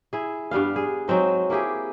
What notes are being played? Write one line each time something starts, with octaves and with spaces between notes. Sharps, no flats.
E4 G#4
G2 G3 B3 F5
G#4
F#3 G#3 C4 D#4
A#3 E4 G4 G#4